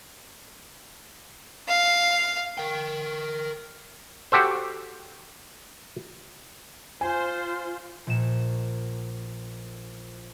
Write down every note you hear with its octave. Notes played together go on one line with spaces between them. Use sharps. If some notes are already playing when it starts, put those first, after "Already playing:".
F5
A#4 G5
F#4 G4 A4 C5
F4 C5 G#5
A#1 A#2 E7